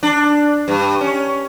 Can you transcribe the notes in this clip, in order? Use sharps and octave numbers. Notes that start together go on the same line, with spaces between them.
D4
G2
C#4